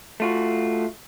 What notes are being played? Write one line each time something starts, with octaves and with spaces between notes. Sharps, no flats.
A3 F4 F#4